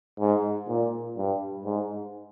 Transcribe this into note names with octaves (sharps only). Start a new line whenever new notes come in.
G#2
A#2
G2
G#2